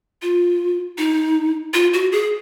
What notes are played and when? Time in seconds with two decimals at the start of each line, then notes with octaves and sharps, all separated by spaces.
0.22 F4
0.98 D#4
1.74 F4
1.93 F#4
2.12 G#4